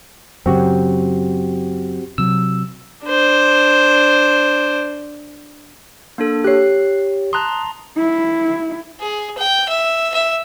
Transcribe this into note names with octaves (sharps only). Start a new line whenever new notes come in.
F#2 C#3 C4 F#4 G4
C3 F#3 E6
D4 C5
A#3 D4 A4
G4 C#5 F#6 C7
A5 A#5 C6 D#6 F#6
E4
G#4
G5
E5
E5